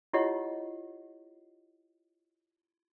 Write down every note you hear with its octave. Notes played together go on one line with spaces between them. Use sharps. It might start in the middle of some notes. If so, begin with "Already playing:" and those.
E4 F4 G4 C#5 D#5 F#5